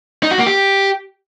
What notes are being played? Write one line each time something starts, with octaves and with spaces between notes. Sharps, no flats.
D#4
F#4
A#3
G4